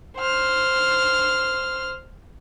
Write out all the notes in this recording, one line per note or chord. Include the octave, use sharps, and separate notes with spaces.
C5 F6